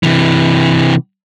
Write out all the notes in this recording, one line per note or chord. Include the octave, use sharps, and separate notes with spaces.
C3 E3